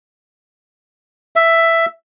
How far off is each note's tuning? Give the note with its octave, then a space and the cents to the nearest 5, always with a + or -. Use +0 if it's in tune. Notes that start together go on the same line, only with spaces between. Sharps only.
E5 +5